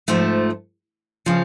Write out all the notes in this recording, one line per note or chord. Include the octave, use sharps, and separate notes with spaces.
G#2 F3 A3
C#3 F3